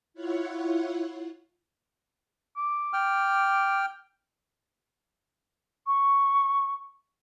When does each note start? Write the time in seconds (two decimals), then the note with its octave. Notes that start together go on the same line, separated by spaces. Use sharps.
0.14 E4 F4 C#5 F#5
2.57 D6
2.93 G5 F6
5.87 C#6